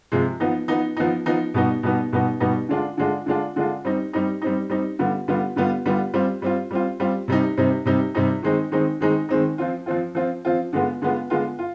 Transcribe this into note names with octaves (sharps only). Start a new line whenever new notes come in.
C3 F3 G#3
F3 B3 D#4
F3 B3 D#4
F3 B3 D#4
F3 B3 D#4
B2 G3 B3 D#4
B2 G3 B3 D#4
B2 G3 B3 D#4
B2 G3 B3 D#4
D3 G#3 D4 F4
D3 G#3 D4 F4
D3 G#3 D4 F4
D3 G#3 D4 F4
G3 C4 D#4
G3 C4 D#4
G3 C4 D#4
G3 C4 D#4
D3 G3 B3 F4
D3 G3 B3 F4
D3 G3 B3 F4
D3 G3 B3 F4
G3 C4 F4
G3 C4 F4
G3 C4 F4
G3 C4 F4
C3 G3 C4 D#4
C3 G3 C4 D#4
C3 G3 C4 D#4
C3 G3 C4 D#4
D#3 G#3 C4 D#4
D#3 G#3 C4 D#4
D#3 G#3 C4 D#4
D#3 G#3 C4 D#4
F3 C4 F4
F3 C4 F4
F3 C4 F4
F3 C4 F4
D3 G#3 B3 F4
D3 G#3 B3 F4
D3 G#3 B3 F4
F4